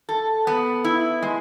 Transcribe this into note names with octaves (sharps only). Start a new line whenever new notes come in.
A4
B3
E4
G#3